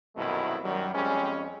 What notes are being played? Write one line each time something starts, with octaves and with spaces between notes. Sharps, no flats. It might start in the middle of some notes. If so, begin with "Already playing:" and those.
C2 F#2 B2 D#3 A3 E4
F#2 D#3 F#3 G3
F2 G3 G#3 C4 C#4